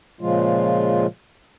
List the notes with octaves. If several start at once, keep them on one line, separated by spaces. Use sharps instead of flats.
A#2 C#3 F3 G#3 F4